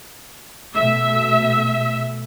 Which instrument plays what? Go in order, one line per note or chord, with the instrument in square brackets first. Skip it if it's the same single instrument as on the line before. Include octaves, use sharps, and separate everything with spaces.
[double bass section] B2 A3 [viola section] E5